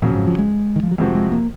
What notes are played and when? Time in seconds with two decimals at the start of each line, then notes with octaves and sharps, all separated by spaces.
0.02 F2 A#2 C#3 F#3
0.15 G#2
0.27 F3
0.39 G#3
0.76 D#3
0.83 F3
0.91 F#3
0.98 F2 C3 F3 G#3 C4 F#4
1.15 G#3
1.32 A#3